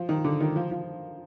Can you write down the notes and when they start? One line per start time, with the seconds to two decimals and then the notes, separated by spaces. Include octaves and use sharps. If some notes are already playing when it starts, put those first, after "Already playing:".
Already playing: F3
0.09 D#3
0.24 D3
0.40 D#3
0.56 F3
0.71 F3